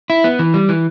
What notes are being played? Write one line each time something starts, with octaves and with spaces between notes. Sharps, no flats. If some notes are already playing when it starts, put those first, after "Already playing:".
E4
B3
E3
G3
E3